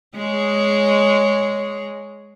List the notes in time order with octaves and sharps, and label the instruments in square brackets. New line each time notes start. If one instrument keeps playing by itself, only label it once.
[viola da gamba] G#3 G#4 C#5